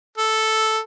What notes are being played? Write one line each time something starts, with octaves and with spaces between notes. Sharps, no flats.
A4